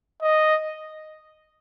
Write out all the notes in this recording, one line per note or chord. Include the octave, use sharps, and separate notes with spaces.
D#5